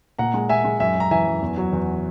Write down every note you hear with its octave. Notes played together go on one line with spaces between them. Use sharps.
A#2 F#5 A#5
G#3
A#2 E5 G#5
G#3
F#2 E5 G#5
F#2 A#5
E3 E5 G#5
F#2
E2
F#3
E2